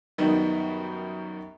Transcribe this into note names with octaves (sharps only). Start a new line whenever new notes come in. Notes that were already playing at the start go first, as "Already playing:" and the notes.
F#2 D#3 G3 B3 D#4